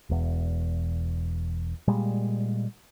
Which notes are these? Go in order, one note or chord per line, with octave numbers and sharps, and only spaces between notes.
E1 E2
A#2 G3 G#3